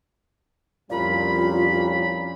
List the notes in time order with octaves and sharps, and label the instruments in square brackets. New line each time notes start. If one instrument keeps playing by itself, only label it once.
[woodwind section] C2 A#2 B5 [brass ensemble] F2 G3 C#4 [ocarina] F4